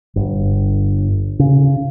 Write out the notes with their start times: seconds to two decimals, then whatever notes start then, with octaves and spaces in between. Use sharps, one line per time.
0.16 G1
1.39 C#3